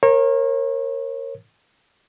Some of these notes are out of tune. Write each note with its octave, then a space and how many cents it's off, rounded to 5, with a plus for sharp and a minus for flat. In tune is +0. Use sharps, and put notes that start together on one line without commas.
A#4 +0 C#5 -35